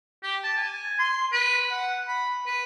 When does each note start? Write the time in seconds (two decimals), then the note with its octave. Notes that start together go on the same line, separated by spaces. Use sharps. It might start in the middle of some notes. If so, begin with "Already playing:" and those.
0.23 G4
0.44 A5
0.57 G#5
0.99 C6
1.32 B4
1.71 F#5
2.08 B5
2.46 B4